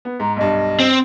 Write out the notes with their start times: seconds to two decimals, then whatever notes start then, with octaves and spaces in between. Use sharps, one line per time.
0.05 B3
0.20 G#2 A#5
0.37 B1 G2 D#5
0.80 C4